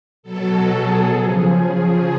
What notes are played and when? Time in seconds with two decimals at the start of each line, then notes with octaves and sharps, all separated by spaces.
0.23 B2 F#3 A4
0.68 G#4
1.13 C#3 F3